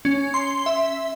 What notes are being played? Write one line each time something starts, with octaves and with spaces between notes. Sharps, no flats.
C#4
C6
E5